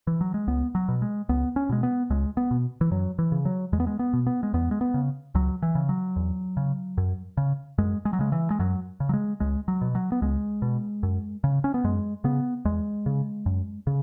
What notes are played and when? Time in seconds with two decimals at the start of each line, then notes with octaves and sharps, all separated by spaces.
0.07 E3
0.21 F#3
0.34 G#3
0.47 C#2 B3
0.75 F#3
0.88 B2
1.02 G#3
1.29 C#2 B3
1.56 C#4
1.69 B2 G#3
1.83 B3
2.10 C#2 G#3
2.37 B3
2.51 B2
2.81 E3
2.91 F#2 F#3
3.19 E3
3.32 C#3
3.45 F#3
3.73 E2 G#3
3.80 B3
3.87 G#3
3.99 B3
4.13 B2
4.27 B3
4.43 G#3
4.54 E2 B3
4.71 G#3
4.81 B3
4.94 C#3
5.35 C#2 F#3
5.62 E3
5.75 C#3
5.89 F#3
6.16 E2
6.57 C#3
6.98 F#2
7.37 C#3
7.78 F#2 G#3
8.05 G#3
8.13 F#3
8.19 C#3 G#3
8.32 E3
8.50 G#3
8.59 F#2 F#3
9.00 C#3
9.09 F#3
9.13 G#3
9.40 C#2 G#3
9.68 F#3
9.81 B2
9.95 F#3
10.12 B3
10.22 C#2 G#3
10.62 B2
11.03 F#2
11.44 C#3
11.64 C#4
11.74 B3
11.84 F#2 G#3
12.24 C#3 B3
12.65 E2 G#3
13.06 C#3
13.46 F#2
13.87 C#3